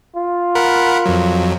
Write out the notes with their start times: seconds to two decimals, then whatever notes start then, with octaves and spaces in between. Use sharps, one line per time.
0.16 F4
0.55 A#4 F#5 B5
1.06 F2 F#3